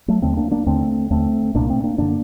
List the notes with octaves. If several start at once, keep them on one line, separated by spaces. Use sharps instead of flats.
F#3 A3
D#2 D3 A3 C4
A#3 D4
A#3 D4
D#2 D3 A3 C4
D#2 D3 A3 C4
C2 A#2 A#3 D4
A3 C4
A#3 D4
F#2 D3 A#3 D4